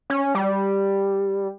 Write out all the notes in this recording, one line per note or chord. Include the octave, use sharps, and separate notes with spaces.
C#4
G3